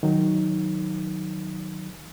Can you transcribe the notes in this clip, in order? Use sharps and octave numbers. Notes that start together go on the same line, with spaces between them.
D#3 F#3 D#4